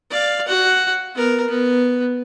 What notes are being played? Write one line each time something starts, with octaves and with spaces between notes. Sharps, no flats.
D5 F5
F#4 F#5
B3 A#4
B3